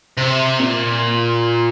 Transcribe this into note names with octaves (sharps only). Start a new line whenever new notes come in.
C3
A#2